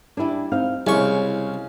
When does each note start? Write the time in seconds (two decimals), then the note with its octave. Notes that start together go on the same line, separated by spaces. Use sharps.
0.17 G3 D4 E4 G#5
0.52 C4 D#4 F5
0.87 C2 C#3 G#3 C#4 E4 G#4 C#6